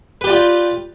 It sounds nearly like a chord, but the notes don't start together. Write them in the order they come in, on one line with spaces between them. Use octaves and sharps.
B4 G4 D5 F4